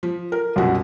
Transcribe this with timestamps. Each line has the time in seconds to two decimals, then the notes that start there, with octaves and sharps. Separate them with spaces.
0.03 F3
0.32 A#4
0.56 C2 F#2 B2 F#4